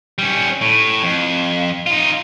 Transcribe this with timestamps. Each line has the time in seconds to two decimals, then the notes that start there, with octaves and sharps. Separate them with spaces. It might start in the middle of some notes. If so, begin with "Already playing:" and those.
0.18 G3 C#4
0.61 A2
1.03 F2
1.87 D#4 F4